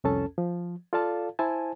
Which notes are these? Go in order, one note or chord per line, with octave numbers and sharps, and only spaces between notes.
C2 F2 C#4 A4 A5
F3
F4 A4 D5 F5 A5
E4 C5 G#5 A5